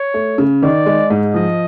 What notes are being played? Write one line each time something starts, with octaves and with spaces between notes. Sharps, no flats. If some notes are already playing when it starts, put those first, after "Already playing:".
Already playing: C#5
A3
C#3
D#3 D5
G#3
G#2
F3 D#5